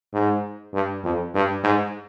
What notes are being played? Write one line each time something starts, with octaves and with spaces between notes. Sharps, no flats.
G#2
G2
F2
G2
G#2